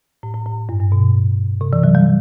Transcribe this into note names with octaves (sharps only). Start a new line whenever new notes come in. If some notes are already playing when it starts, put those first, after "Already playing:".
A2
A2
A2
G2
G2
B2
C3
E3
F#3
G3